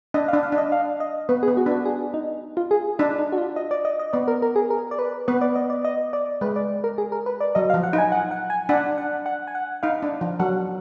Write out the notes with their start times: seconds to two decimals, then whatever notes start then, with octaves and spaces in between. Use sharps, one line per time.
0.14 D4 D#5
0.28 F5
0.33 D4
0.43 F5
0.52 D4
0.58 D#5
0.72 F5
1.00 D#5
1.29 B3 B4
1.43 G#4
1.48 B3
1.57 F#4
1.66 D4
1.71 F#4
1.85 G#4
2.14 D#4
2.57 F4
2.71 G#4
2.99 D4 D#4
3.18 D#4
3.32 F#4
3.38 F4
3.56 D#5
3.71 D5
3.85 D#5
3.99 D#5
4.13 B3 D5
4.28 A#4
4.42 A#4
4.56 G#4
4.70 A#4
4.91 D5
4.99 B4
5.28 B3 B4
5.41 D5
5.56 D#5
5.70 D5
5.85 D#5
6.13 D5
6.41 G#3 B4
6.56 D5
6.84 A#4
6.98 G#4
7.12 A#4
7.26 B4
7.41 D5
7.55 F#3 D#5
7.70 F5
7.74 F3
7.83 F#5
7.93 D#4
7.98 G#5
8.12 F#5
8.31 F#5
8.50 G#5
8.69 D4 F#5
8.98 F#5
9.26 F#5
9.47 G#5
9.55 F#5
9.83 D#4 F5
10.03 D4
10.21 F3
10.40 F#3 F#5